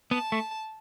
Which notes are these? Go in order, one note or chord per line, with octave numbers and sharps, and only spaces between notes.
B3 A5
A3